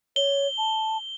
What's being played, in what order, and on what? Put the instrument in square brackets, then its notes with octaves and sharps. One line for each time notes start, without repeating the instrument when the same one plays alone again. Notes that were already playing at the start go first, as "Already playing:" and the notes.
[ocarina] C#5 [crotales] G7
[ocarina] A5